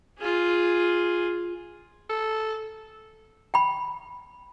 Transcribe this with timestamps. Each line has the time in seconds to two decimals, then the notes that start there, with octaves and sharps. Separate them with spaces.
0.19 F4 G#4
2.10 A4
3.54 G5 B5